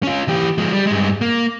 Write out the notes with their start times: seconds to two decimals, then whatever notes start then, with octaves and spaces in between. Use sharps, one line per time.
0.03 C#4 F4
0.28 E3 G4
0.58 F3 G#3
0.73 G3
0.87 G2 G#3
1.21 A#3